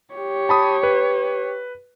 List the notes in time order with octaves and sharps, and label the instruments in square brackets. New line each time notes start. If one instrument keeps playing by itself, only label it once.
[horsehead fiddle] G4 C#5
[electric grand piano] A5 B5 D#6
B4